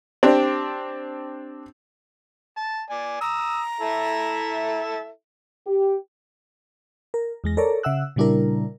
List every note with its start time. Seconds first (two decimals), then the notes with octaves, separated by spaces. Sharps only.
0.23 C4 D4 G4
2.57 A5
2.90 D5 G#5
3.21 A#5 D#6 E6
3.80 E4 A4 E5
5.67 G4
7.14 A#4
7.44 E2 G#3 A#6
7.57 A4 A#4 C#5 D5 A#5
7.83 C#3 E5 F#5 E6 F#6
8.16 A#2 C#3 G3 D4 E4 A#4